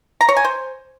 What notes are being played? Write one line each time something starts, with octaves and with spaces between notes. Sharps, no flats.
A#5
C#5
G#5
C5